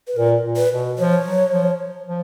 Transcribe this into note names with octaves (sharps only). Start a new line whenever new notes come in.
B4
A#2 A#4
A#2
B4
B2
F3 C#5
F#3
F3
F3